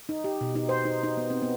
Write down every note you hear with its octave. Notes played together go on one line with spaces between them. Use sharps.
D#4
G4
B2
D#4
C5
D#4
D#4
B3
C4
B3